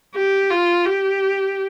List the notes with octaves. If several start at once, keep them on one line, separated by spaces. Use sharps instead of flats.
G4
F4
G4